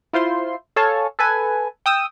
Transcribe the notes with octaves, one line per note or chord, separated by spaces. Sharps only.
E4 F4 C5 C6
A4 C#5 F5 G#5 A5
A4 B4 G#5
G5 D#6 E6